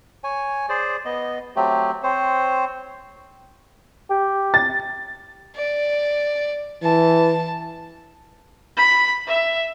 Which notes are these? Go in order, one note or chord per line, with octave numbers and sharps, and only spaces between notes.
C#5 G#5
G#4 C5 D5
B3 D#5
F#3 A3 C4 G4
C4 C5 C#5
G4
A6
D5
E3 A5
B5
E5